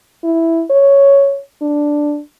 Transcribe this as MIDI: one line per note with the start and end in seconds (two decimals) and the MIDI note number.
0.24 0.63 64
0.70 1.40 73
1.62 2.20 62